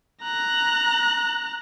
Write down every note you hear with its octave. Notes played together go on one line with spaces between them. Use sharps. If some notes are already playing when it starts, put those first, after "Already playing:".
A#5 F#6